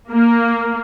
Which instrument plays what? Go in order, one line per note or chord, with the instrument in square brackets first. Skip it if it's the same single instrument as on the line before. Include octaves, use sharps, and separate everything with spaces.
[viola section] A#3